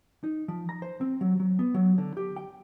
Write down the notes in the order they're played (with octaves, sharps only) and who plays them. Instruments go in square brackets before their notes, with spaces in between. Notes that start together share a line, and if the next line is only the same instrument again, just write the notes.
[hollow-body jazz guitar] D#4
F3
A#5
C5
C4
F#3
F#3
B3
F#3
D3
G4
G5